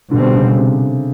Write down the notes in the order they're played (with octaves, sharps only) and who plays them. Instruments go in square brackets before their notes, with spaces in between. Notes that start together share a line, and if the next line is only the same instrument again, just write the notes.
[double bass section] B2 G3 C4 [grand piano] D3
[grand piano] C#3
C3